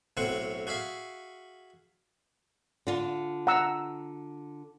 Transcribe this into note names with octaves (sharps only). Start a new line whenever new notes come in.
B1 A2 C4 F#4 F#5 C#6
F#4 G#4 E5 F5
D3 F4 A5
F#5 A#5 E6